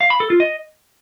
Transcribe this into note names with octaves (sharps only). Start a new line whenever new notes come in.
F5
B5
A4
F4
D#5